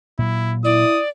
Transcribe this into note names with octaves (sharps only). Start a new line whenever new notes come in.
A#2 F#3 E4
E4 D5 D#6